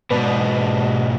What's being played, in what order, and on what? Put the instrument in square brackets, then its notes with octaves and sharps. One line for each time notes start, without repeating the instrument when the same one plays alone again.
[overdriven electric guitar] G#2 B2 [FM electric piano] B4 D5 A5